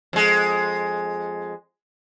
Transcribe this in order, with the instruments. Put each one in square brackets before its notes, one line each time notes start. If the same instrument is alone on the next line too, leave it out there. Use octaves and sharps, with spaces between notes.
[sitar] F2 G#3